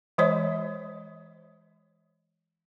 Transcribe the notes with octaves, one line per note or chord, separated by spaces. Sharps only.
E3 G#3 C5 C#5 D#5